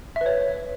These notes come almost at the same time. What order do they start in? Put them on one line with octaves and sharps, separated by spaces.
E5 B4 C#5